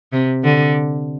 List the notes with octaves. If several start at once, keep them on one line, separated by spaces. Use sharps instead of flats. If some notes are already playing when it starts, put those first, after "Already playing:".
C3
D3